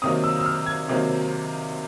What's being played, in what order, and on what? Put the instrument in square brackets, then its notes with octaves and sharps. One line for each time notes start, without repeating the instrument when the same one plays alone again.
[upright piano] C3 D#3 F#3 A#3 D#6
E6
E6
F6
G#6
C3 D#3 F#3 A#3